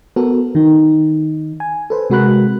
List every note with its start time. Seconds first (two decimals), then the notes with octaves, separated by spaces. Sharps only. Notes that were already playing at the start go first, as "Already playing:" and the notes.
0.16 B3 F#4 A4 A#4
0.55 D#3 D#4
1.60 G#5
1.90 A4 B4 C5
2.10 C3 G#3 F#4 A#4 B5 F#6